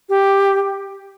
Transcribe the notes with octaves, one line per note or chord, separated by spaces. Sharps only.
G4